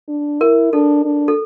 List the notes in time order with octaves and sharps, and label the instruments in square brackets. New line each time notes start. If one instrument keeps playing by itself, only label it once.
[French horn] D4
[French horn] E4 [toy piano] A#4
[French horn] D4 [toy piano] A4
[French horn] D4
[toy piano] A4